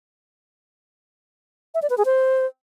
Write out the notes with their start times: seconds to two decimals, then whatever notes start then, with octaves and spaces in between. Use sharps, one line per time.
1.74 E5
1.82 D5
1.90 B4
1.98 G#4
2.05 C5